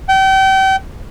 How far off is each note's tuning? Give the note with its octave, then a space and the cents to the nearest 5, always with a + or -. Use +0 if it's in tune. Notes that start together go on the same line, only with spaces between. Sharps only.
G5 -35